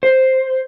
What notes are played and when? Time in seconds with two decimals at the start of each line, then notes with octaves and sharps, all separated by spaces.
0.03 C5